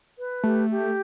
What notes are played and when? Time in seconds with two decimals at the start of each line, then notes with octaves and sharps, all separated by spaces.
0.18 B4
0.43 A3 G4
0.70 G4